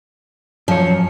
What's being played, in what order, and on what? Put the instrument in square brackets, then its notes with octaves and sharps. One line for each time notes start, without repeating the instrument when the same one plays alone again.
[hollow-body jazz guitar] F#2 C#5 [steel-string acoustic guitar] F3